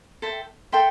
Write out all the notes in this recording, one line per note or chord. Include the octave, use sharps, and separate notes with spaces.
A4 E5 G5 C6
A4 E5 G5 C6